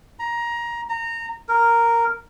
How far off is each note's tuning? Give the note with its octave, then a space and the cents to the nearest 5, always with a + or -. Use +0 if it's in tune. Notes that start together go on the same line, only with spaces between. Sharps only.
A#5 +20
A#5 -20
A#4 -5